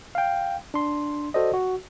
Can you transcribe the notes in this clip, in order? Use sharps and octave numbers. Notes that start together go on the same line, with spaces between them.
F5 G5
D4 C6
F#4 A4 C5 D5 D#5
F#4